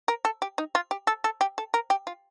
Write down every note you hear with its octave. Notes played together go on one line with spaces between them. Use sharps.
A#4
A4
G4
D#4
F4
G4
A4
A4
G4
A4
A#4
G4
F4